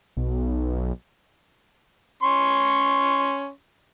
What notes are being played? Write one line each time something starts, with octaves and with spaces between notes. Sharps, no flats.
B1
C#4 C6 C#6